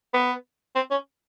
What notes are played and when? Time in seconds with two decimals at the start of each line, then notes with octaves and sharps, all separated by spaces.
0.14 B3
0.75 C4
0.91 C#4